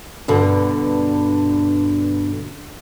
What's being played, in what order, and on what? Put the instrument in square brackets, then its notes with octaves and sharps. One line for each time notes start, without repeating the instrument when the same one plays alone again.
[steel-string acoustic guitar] G2 B2 D3